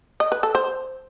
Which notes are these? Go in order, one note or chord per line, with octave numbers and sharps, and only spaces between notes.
D#5
B4
A4
C5